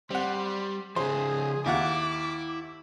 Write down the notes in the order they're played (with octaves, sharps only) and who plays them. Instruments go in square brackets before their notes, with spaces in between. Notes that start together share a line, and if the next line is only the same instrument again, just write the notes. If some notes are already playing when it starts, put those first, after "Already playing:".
[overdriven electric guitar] G3 [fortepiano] C4 F#5 [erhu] C6
[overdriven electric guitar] C#3 F3 [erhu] G#4 [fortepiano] C5
[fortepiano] D#2 F4 F#5 [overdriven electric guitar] E4 [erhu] D6